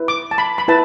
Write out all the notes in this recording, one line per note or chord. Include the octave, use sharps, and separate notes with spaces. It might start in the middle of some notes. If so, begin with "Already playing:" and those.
Already playing: E4 B4
D6
A5
B5
B5
E4 B4 A5